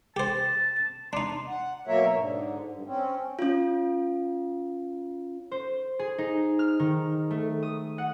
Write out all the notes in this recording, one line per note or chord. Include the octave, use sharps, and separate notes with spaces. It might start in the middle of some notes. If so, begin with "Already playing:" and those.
G4 C5 A5
D4 D#4 C6
F#5
B2 F#3 A#3 A#4 C#5 E5
G#2 D3
G2
C4 C#4
C#4 F4
C5
G#4
D#4
F6
D#3
A3
D#6
F#5